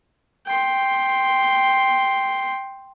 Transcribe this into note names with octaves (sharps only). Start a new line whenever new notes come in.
G5 C6